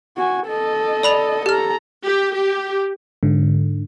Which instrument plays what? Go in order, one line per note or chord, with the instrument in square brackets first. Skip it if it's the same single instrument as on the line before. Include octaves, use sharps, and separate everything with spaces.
[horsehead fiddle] F#4 G#5
A4 D#5
[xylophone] D5 B5 F7
[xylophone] G4 F6 [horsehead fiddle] A4 A#5
[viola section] G4
G4
[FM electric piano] G#2 D3